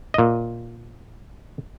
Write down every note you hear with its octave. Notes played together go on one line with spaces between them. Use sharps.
A#2 D#5